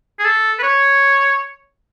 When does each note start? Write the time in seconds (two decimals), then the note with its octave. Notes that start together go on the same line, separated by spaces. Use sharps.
0.19 G#4
0.25 A4
0.59 B4
0.63 C#5